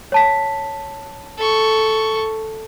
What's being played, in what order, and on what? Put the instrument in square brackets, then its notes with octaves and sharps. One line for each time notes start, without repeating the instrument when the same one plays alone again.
[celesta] C#5 A5 B6
[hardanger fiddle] A4 C#6